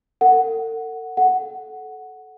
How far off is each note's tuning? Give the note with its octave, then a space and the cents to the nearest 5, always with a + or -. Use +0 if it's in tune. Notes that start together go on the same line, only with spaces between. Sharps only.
A4 +45 F#5 +0
A4 -20 F#5 +0